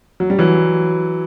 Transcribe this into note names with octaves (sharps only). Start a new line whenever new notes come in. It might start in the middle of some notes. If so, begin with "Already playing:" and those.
F#3
G3
E3 F#3